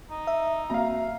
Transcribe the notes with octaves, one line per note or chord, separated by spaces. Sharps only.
D#4
E5
A#3 C4 F#4 F5 A#5